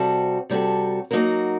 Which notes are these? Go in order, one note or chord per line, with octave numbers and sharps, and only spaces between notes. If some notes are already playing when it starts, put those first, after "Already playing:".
Already playing: C3 G3 C4 F#4 A4
C3 G3 C4 F#4 A4
F#3 A#3 D#4 F#4 A#4